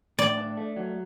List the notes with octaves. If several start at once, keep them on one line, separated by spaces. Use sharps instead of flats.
A2 D5
D4
A3
F#3